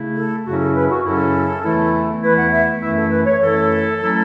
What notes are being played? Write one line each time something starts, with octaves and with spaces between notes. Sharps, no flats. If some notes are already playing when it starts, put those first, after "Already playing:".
Already playing: C#3 A3 E4
A4
F#2 C#3 F#3 C#4 E4 F#4
A4
B4
F#4
F#2 C#3 F#3 C#4 E4 A4
E2 E3 A3 E4
E2 E3 A3 E4 B4
F#5
E5
F#2 E3 A3 E4 E5
A4
B4
C#5
F#2 E3 A3 E4 A4
F#3 A3 C#4 E4